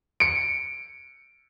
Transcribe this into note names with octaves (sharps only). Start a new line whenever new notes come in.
C#7 D7